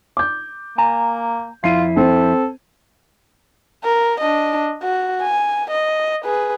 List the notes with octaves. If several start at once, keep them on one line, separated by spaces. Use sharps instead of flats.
D6 G6
A#3 G#5 A#5
F2 E4 F4 C7 D#7
C4 A4
A#4
D4 D#5
F#4
G#5
D#5
G#4 B4